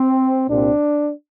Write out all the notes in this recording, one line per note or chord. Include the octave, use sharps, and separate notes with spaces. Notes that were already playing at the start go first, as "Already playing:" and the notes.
Already playing: C4
C2 A#2 G3 C4 D4